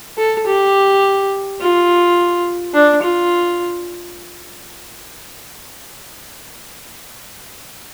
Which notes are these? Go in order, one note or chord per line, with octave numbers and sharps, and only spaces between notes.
A4
G4
F4
D4
F4